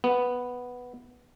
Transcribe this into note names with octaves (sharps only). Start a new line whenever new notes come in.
B3